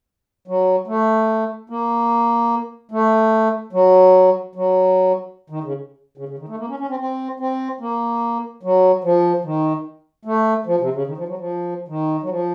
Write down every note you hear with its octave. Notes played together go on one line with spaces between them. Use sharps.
F#3
A3
A#3
A3
F#3
F#3
D#3
C#3
C#3
C#3
D#3
A3
A#3
C#4
C#4
C4
C4
C4
A#3
F#3
F3
D#3
A3
F3
C3
C#3
D#3
F3
F#3
F3
D#3
F#3
F3